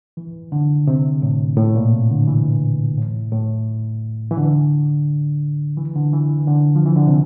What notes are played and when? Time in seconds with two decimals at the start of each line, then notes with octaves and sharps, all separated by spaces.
0.17 E3
0.52 D3
0.87 C3
1.22 A2
1.57 A2
1.75 A#2
1.92 C3
2.10 D3
2.27 E3
2.98 A2
3.32 A2
4.31 E3
4.37 D3
5.77 E3
5.96 D3
6.13 E3
6.30 E3
6.48 D3
6.75 F3
6.86 E3
6.96 D3
7.07 C3